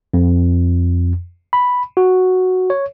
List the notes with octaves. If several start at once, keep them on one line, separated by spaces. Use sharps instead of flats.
F2
B5
F#4
C#5